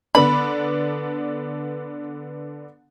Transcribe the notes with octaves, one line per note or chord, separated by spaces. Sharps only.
D3 B3 D4 B5